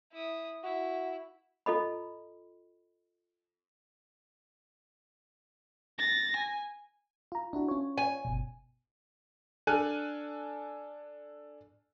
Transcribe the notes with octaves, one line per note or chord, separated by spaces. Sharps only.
E4 D#6
E4 F#4
F4 A4 D#5 B5
A6 A#6
G#5
F4 A#5
D4 E4 F#4
C#4 F4 C#5
G#5
G1 B2
D4 A4 G#5 F6 F#6 D#7